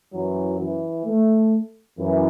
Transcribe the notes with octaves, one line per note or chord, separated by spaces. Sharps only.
F#2 E3 F#3
E3
A3
F#2 E3